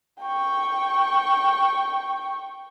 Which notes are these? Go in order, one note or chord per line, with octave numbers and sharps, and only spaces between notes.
G5 C#6